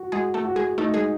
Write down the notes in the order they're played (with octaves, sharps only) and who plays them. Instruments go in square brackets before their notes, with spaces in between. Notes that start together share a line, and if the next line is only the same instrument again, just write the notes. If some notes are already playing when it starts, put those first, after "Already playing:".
Already playing: [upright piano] F#4
[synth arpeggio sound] G#3 G#4 [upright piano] F#4
[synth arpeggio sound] A3 A4
[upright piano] F#4
[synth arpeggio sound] G#3 G#4
[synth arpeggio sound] A3 A4 [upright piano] D#4
[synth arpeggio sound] G#3 G#4